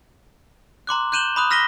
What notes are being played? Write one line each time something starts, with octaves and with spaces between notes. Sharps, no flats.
A#5 C6 D6 F#6
F#6 G6 D#7 E7 F#7 G7
B5 D#6 F#6
F6 A#6 B6 D#7 G7